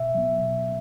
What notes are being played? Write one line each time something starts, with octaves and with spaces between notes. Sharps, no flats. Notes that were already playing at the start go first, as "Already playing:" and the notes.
Already playing: B2 E5
F#3 B3
B2